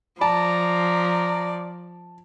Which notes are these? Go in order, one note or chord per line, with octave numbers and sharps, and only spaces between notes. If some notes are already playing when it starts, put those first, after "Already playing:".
F3 D5 A5 A#5